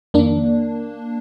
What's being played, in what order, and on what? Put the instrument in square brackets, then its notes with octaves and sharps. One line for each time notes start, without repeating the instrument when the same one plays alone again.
[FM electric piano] F2 D#3 A#3 D4